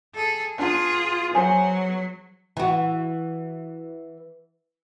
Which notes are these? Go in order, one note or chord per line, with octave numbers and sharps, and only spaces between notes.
G#4 A4
B3 D4 F4 G#4 A#5
F#3 B3 G#4 C5
E3 F#4